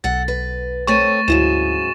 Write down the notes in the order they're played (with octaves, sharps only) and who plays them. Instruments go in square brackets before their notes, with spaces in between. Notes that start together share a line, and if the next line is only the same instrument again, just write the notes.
[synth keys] B1 [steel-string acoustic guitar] A4 F#5 [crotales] A6
[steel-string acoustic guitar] B4
[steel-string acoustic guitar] A3 C4 C#5 [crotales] C#6 A6 D#7
[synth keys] D2 E4 [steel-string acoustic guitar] G#2 C#3 F#3 [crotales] E7